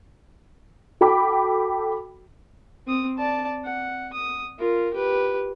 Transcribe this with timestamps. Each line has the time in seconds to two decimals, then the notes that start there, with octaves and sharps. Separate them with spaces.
1.01 F#4 A4 G5 B5 D6
2.87 C4 D#6
3.18 D5 A5
3.65 F#5
4.13 D#6
4.59 F4 A#4
4.93 G4 B4